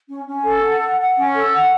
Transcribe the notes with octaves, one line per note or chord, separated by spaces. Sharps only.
C#4
C#4
A4
F#5
F#5
F#5
C#4
A4
F#5